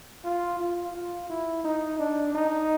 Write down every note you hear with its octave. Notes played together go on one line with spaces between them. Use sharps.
F4
F4
F4
E4
D#4
D4
D#4